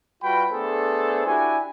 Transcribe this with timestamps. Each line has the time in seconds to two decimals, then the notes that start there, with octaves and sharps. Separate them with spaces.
0.22 G3 F4 F#4 B4 G5 B5
0.51 A3 B3 D4 G#4 A4 C5
1.26 D4 E4 F#4 G4 G#5